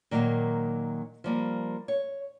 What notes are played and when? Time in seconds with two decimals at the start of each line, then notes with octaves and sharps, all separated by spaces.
0.11 A#2 D#3 F#3 G3 A#3
1.24 F3 G3 A#3
1.88 C#5